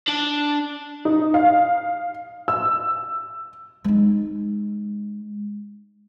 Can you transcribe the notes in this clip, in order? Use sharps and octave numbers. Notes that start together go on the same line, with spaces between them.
D4 A5
D#4
F5
E6
G#3 D#4